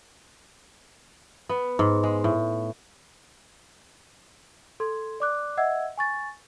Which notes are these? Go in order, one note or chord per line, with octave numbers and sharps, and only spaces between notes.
B3
G#2
G#3
A2
A4 C6 G#6
D5 D6 F#6
D#5 E5 F#5 E6 G#6
G#5 C#6 A6